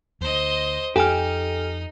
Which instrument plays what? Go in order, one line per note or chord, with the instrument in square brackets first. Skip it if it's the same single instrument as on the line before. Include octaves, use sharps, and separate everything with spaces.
[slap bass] D2 [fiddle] C5 D#5
[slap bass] F2 [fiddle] D#4 [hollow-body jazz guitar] G4 [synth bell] A4 G#5 F6